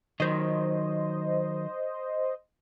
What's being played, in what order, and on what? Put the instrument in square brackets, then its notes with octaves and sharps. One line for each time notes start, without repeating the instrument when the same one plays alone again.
[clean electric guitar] D#3 F#3 [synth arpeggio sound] C5 D#5